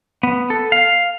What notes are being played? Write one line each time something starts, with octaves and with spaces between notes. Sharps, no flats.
B3
A4
F5